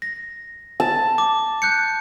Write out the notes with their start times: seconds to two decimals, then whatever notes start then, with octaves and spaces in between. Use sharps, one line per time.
0.02 A#6
0.80 A5
1.18 D6
1.62 F#6 G6 C#7